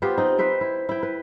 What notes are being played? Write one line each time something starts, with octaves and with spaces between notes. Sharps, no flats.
B3 F4 G4 C5
C4 D#4
B4 C5 E5 G5
E4
E4 G5
B4